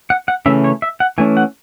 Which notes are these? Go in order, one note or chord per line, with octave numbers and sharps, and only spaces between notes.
F#5
F#5
C#3 E3 A3 C#4 E5
C#5
E5
F#5
E3 A3 C#4 G#5
F#5